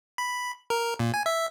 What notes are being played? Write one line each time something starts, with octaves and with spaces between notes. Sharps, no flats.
B5
A#4
A#2
G#5
E5